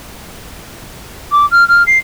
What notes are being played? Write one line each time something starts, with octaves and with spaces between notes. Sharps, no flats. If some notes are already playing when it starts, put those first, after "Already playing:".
D6
F6
F6
C7